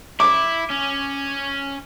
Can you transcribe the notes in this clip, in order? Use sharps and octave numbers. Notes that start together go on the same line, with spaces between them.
E4 D6
C#4